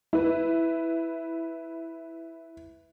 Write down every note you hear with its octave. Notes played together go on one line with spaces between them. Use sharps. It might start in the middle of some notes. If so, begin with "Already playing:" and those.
E4 B4